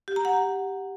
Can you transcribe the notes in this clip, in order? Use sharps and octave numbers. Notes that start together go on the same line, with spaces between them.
G4
A#5
F#5
G4